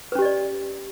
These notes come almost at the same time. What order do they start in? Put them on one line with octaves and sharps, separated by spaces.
B4 C#4 G4 D#5 D5